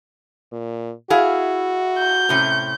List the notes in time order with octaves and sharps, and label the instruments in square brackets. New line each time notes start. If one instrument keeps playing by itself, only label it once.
[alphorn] A#2
[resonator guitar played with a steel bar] E4 G#4 F5 [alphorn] F#4
[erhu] G6
[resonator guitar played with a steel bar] A2 C3 C#4